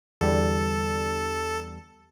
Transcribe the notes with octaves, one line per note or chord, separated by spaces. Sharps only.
E2 D3 G3 A4